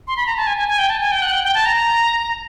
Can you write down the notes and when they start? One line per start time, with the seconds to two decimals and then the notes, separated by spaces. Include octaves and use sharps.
0.08 C6
0.17 B5
0.27 A#5
0.37 A5
0.47 G#5
0.57 G#5
0.68 G#5
0.79 G5
0.89 A5
1.01 G#5
1.11 G5
1.22 F#5
1.32 G5
1.44 G5
1.54 A5
1.66 A#5